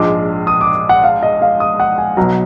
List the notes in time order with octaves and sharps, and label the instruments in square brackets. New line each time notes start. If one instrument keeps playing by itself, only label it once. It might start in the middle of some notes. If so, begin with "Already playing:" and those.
Already playing: [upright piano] A#1 G#2 F3 G#3 D4 [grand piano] D6
[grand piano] D#6
D6
F#5
F5
D#5
F5
D#6
F#5
G#5
[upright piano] B1 B2 F#3 [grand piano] A#5